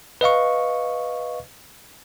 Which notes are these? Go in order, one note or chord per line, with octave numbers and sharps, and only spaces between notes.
B4 D#5 F5 C#6